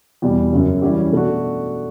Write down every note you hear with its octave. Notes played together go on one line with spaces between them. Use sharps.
E2 B2 G3
F#2 C#3 F#3 C#4
E3 G3 C#4 G4
B2 A3 D4 F#4